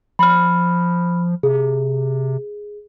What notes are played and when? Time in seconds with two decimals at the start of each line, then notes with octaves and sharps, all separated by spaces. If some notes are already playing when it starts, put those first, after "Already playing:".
0.19 F3 B5 F6
1.43 C3 G#4